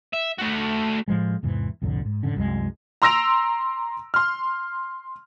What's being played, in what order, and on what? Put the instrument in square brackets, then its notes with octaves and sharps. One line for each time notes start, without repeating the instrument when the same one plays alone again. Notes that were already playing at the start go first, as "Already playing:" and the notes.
[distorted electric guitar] E5
A3 F#4
[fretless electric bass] A2 F3 G#3
E2 G#2 C3 E3
C2 F2 A2 D3
G#2
F1 A2 D3 C#4
C2 F#2 G3 G#3
[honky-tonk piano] A#5 C6 E6 A#6 D7 F7
C6 F6